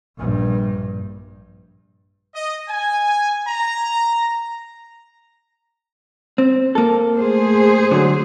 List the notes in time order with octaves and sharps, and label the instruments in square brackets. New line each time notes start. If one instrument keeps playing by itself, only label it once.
[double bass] A#1 G2
[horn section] D#5
G#5
A#5
[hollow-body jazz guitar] C4
A#3 A4
[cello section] A3 G#4 C5
[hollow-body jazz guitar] D3 F#3